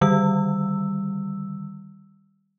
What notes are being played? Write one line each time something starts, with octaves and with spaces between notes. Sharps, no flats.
D3 D#3 G3 E6